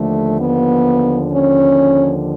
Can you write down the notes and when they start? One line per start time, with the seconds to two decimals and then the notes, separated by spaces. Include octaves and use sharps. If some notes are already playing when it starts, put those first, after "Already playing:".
Already playing: D#2 D3 F3 A3
0.40 B3
1.32 C#4